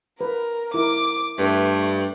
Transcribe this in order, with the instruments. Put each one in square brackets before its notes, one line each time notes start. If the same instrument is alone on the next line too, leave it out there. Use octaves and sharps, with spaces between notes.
[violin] A#4 [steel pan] B4
[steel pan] E4 A#4 [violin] D6
[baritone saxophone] G2 [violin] A3 [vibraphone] B4